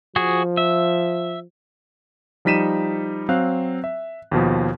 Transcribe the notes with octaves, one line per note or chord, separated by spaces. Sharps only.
F3 F#4 G#4
E5
F3 G3 D#4 B6 D#7 E7
F#3 C4 F5 F#6
E5
D#2 B2 F3